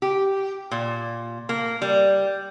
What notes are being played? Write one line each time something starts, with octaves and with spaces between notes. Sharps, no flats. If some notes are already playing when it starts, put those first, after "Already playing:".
G4
A#2
A#3
G3